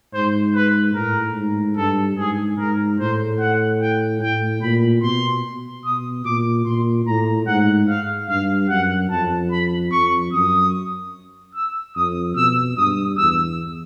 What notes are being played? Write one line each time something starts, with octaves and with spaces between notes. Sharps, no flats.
G#2 C5
B4
A2 A#4
G#2
G2 A4
G#2 G#4
G#2 A#4
A2 C5
F#5
G5
A2 G5
A#2 B5
B2 C6
B2 D#6
A#2 D6
A#2 C6
A2 A#5
G#2 F#5
F5
G2 F5
F#2 F#5
F2 A5
B5
F2 C#6
F#2 D#6
E6
F2 D#6
B2 E6
G2 D#6
E2 E6